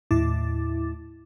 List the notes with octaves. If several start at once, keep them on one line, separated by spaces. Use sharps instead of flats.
D#2 A2 E4 D6 A6